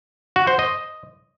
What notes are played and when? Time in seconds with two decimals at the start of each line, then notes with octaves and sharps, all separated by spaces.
0.36 F#4
0.47 C5
0.59 D#5